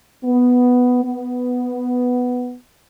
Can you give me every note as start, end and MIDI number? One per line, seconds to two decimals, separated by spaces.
0.25 0.99 59
1.04 2.54 59